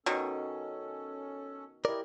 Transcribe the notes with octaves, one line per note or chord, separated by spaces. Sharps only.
B2 D#3 C#4 A4
E4 G4 A#4 D5 D#5